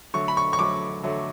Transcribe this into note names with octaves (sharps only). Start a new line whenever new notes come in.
D3 F#3 A3 C#6
B5
C#6
C#6
D3 F#3 A3 D6
D3 F#3 A3